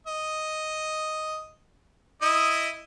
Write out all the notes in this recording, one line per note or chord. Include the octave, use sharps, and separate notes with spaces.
D#5
E4 D#5 D#6